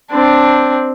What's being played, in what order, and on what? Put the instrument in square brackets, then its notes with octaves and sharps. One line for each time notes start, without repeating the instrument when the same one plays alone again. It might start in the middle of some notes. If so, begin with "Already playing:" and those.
[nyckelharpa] C4 D4